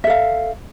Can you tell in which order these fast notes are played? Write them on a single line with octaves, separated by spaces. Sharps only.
E5 A4 F5